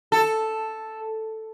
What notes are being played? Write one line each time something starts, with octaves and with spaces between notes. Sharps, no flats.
A4